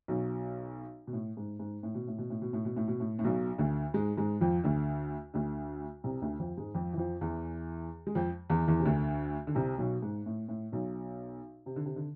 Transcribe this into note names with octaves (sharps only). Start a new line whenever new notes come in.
B1 B2
B2
A2
G#2
G#2
A2
B2
A2
B2
A2
B2
A2
B2
A2
B2
A2
A2
B1 B2
D2 D3
G#2 G#3
G#2 G#3
F2 F3
D2 D3
D2 D3
C2 C3
D2 D3
F2 F3
G#2 G#3
F2 F3
E3
F2 F3
E2 E3
G#3
F2 F3
E2 E3
E2 E3
C3
D2 D3
D3
C2 C3
B1 B2
G#2
A2
A2
B1 B2
C3
D3
C3
D3